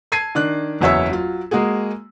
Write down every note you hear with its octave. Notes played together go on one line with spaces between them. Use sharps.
A5 G#6 C7 D#7
D#3 D4 F#6
F#1 E2 F#4 C#5 E5 E6
F#3 F4
G#3 A#3 F#4 G#4